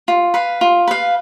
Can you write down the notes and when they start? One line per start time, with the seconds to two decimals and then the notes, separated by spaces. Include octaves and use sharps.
0.08 F4
0.34 B4 F5
0.61 F4
0.88 B4 F5